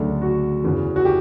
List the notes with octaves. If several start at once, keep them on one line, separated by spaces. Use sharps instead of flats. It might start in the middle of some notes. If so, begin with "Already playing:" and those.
Already playing: D2 C#3 F#3 A3 D4 A4
F#4
E2 C#3 E3 B3
F#4
G4